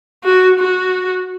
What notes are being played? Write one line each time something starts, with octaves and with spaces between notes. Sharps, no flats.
F#4
F#4